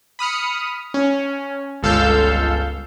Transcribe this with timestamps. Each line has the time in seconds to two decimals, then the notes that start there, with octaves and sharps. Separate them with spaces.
0.19 B5 D#6 F6 C#7
0.94 C#4
1.83 G1 C#2 A4 F5 E6 G6